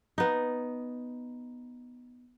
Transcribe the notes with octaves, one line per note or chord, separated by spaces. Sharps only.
B3 D#4